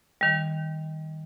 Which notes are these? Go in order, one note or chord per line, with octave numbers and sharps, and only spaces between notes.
D#3 G3